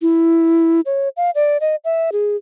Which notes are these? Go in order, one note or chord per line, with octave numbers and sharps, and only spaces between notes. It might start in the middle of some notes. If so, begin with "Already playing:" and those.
E4
C#5
F5
D5
D#5
E5
G#4